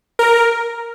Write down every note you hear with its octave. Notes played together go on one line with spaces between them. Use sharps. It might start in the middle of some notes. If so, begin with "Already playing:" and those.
A#4